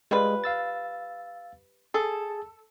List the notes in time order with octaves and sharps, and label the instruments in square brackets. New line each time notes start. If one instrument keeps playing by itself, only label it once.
[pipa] G3 F4 B4 [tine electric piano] G#3
[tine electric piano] F5 E6 A6
[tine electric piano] G#4 A5 [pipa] A4